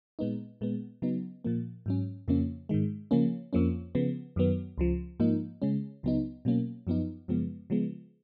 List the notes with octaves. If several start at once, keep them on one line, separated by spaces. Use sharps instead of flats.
A#2 G#3 B3 D#4
A#2 G#3 B3
C#3 F#3 B3 D#4
A#2 F3 A#3
G#2 F#3 C#4
F2 C#3 F3 A#3 C#4
G#2 D#3 G#3
C#3 F3 A#3 C#4
F2 F3 A#3 C#4
C#3 F3 B3
F#2 D#3 F#3 B3
C#2 C#3 F3
G#2 F3 A#3 D#4
C#3 G#3 C#4
C#2 C#3 F#3 B3 D#4
B2 F#3 A#3 C#4
F#2 F3 B3 D#4
F#2 C#3 F3 G#3 B3
C#3 F3 G#3 B3